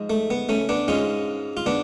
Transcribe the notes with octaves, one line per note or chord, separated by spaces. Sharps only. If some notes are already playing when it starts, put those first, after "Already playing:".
Already playing: G#2 F3 G#3
A3
B3
A3 C#4
B3 D4
G#2 G#3 C#4 F4
F4
B3 D4